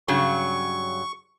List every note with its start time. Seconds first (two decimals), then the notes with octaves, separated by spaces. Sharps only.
0.08 G2 C#3 F#3 C#6